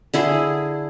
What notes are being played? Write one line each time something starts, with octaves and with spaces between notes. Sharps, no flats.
D3 E4 G#4